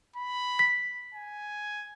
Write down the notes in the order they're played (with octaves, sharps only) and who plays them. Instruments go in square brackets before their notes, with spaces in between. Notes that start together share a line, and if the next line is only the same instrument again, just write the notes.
[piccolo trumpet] B5
[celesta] B6
[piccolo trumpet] G#5